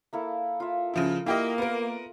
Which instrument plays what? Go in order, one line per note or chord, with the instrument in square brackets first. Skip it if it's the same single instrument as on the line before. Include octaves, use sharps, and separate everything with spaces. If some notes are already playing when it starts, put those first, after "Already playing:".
[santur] A#3 E4 A4
F4 E5
[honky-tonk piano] C#3 F3 E4
[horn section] A#3 [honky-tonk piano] E4 G4 D#5
[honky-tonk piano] B3 A#4